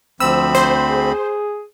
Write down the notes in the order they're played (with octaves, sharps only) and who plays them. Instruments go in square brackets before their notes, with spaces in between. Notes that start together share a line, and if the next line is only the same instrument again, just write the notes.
[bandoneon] D2 C4 B5 [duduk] F3 [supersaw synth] E6
[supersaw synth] C5
[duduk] G#4